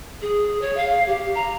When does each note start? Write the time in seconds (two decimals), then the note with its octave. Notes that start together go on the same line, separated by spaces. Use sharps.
0.22 G#4
0.62 C#5
0.77 F5
1.07 G4
1.35 A#5